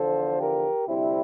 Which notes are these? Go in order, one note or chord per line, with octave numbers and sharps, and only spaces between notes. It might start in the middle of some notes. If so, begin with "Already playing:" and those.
Already playing: E2 D3 F3 A4 C5
G4 A#4
D2 C3 G3 C4 E4